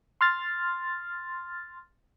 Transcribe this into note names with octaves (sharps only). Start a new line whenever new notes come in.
C6 F6 A6